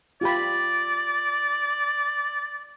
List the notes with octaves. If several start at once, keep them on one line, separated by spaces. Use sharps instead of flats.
F4 G4 D5 B5